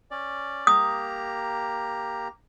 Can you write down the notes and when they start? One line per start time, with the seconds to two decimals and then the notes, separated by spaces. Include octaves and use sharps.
0.11 C#4 D5
0.67 A#3 G4 A#5 D#6